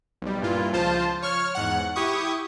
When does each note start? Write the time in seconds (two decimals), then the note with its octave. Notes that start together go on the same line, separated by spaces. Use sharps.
0.22 B1 G3
0.41 G2 A#2 E4 F4
0.72 C#2 F3 F4 C5 A5
1.22 C#5 C#6 F6
1.55 E2 G#2 F#5
1.96 E4 G4 C#6 D#6